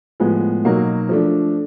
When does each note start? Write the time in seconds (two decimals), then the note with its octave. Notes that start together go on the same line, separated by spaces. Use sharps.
0.20 A2 F3 G#3 B3
0.65 B2 F#3 A#3 D#4 F#4
1.09 F3 A3 D4